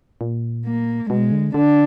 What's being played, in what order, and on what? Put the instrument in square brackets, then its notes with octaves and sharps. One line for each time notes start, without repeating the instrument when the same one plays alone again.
[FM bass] A#2
[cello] A#3
[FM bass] B2 [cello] G#3
[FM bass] D3
[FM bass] D3 [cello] D4